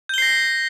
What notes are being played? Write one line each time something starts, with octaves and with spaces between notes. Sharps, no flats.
G6 A#6 C7 G7